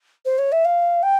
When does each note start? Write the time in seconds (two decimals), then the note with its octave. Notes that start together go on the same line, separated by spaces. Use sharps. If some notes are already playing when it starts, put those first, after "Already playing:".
0.25 C5
0.38 C#5
0.52 E5
0.65 F5
1.02 G5